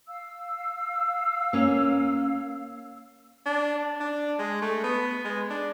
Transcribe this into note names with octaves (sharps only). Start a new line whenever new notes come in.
F5 E6
A#3 C#4
D4
D4
G#3
A3
B3
G#3
D4